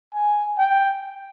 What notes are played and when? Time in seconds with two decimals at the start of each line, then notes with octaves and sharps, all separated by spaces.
0.13 G#5
0.58 G5